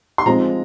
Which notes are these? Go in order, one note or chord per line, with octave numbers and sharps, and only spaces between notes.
C6
F3 G#3 C4 A#5